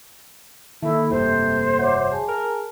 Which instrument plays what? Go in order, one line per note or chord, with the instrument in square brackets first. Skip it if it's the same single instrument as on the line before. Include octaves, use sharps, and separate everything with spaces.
[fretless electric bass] D#3 [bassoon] A3 [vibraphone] A#3 A4 [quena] E4
[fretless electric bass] F1 G2 [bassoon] C3 [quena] C5
[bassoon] F#3 [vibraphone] E5 D6
[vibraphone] G#4 G#5 A5
[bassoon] A#4